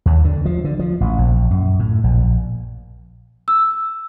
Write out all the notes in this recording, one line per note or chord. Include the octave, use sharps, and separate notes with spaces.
D#2
D3
F3
D3
F3
A1
A#1
F#2
A2
A#1
E6